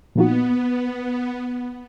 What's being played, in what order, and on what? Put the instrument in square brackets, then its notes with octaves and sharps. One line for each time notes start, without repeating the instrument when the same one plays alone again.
[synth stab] A#2 F3 A#3 D#4 F#4 [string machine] B3